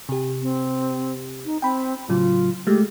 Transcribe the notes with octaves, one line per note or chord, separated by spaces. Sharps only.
C3 G4
C4
D#4
C4 G5 B5
A2 C#3 F#3 F4
G#3 A3 G4